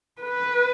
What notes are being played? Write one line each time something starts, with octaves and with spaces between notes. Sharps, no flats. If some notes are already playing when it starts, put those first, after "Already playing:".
B4